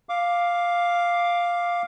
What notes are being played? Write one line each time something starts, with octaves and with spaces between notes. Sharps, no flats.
F5 D6